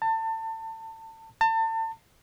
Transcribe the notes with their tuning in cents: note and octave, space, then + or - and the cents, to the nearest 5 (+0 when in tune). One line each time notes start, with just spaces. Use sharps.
A5 +30
A5 +35